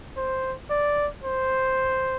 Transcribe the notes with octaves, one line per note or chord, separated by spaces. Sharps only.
C5
D5
C5